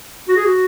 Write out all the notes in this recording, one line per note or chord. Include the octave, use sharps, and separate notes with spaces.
F#4
G#4
F#4